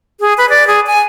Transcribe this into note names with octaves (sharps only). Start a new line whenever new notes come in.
G#4
B4
D5
G#4
G#5